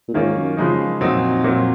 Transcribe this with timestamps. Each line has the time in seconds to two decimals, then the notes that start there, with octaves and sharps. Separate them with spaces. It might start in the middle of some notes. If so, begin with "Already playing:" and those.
0.08 A#2
0.14 G#2 D#3 A#3 C#4 F4
0.35 F#2
0.57 F#2 C#3 F3 G#3 D#4
0.72 F#2
1.01 F2 A#2 F#3 C4 D#4
1.44 A#2 F#3 C4